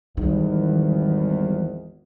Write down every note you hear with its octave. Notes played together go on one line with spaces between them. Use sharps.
G#1 E2 D#3 E3 G3